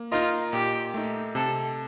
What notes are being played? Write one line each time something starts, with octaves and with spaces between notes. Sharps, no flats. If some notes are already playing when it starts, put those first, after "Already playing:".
Already playing: A#3
D#4 F4 A#4 D#5
A#2 G4
A3 D#4
C3 A4